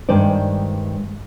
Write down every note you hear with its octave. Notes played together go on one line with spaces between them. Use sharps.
G2 D#3 G#3 C5 D5